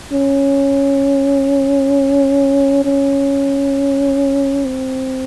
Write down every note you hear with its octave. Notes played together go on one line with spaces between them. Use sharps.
C#4
C#4
C4